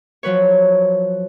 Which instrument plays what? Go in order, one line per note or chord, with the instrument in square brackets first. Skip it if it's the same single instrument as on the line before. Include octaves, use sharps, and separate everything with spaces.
[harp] F3 F#3 B4 C#5